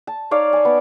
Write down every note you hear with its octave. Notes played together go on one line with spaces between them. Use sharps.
A5
D#4 C#5 D5 F5
G#5 A5
B3